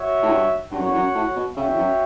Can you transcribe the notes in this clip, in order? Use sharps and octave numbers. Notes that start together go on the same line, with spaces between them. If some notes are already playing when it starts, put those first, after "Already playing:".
Already playing: F#4 C#5 E5
A2
G2
G2 F#4 C#5 F#5
F#2
E2
F#2
A2
B2
C#3 F#4 C#5 E5 G5
E2
F#2